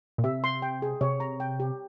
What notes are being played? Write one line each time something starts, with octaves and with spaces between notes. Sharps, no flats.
A#2
C3 E5
C6
G5
G#4
C3 C#5
A#5
G5
G4